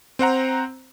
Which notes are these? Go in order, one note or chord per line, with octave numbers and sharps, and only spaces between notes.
C4 C5 F#5 A#5